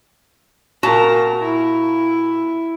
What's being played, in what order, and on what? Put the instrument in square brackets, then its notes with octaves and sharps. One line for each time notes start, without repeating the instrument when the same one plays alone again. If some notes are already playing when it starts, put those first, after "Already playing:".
[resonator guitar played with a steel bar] A#2 F#4 A5 [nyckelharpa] A#4 A#5
[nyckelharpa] E4